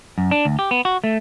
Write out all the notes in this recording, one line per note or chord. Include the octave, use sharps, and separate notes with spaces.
F#2
D4
D2
G4
B3
F#4
A3